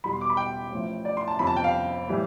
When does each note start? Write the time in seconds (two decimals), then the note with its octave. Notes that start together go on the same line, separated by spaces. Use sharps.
0.04 E2 B2 G3 B5
0.13 C6
0.21 D6
0.30 B5
0.37 G5
0.71 A1 A2 F3
1.05 D5
1.17 C6
1.28 A5
1.39 G1 F2 C3 F3 B5
1.47 A5
1.56 G5
1.64 F5
2.08 A2 E3 G3